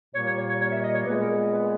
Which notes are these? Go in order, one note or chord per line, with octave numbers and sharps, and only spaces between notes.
A#2 G3 A#3 C#5
C#5
C#5
C#5
C#5
E5
D#5
C#5
A#2 G#3 B3 B4
A#4
B4